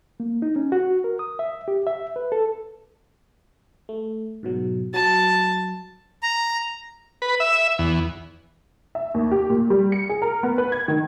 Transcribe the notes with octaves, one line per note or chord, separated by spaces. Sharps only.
A#3
D#4
C#4
F#4
A#4
D#6
E5
G4
E5
B4
A4
A3
G#2 B2 F#3
F#3 A5 A6
A#5
B4
E5
E2
E5
D#2
G4
A#2
G3
C#7
G#4
A#4
B3
B4
G#6
D#3